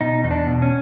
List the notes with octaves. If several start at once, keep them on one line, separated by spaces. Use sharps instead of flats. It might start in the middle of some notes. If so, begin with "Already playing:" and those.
B2 D#4
E2 D#4
D4
B2
C#4